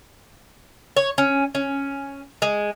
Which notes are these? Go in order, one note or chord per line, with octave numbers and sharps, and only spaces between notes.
C#5
C#4
C#4
G#3